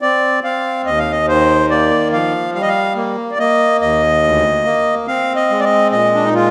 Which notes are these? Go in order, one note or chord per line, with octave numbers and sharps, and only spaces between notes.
C4 D5
C4 F5
D#2 D#5
F5
D#5
D#3 C5
A#3 D5
F3 F5
G3 F5
D#5
F5
A#3
D5
A#3 D#5
D#2 D#5
D2
A#3
C4 F5
D#5
G#3
D5
D#5
A#2 D#5
D4
D#4
G#3 F4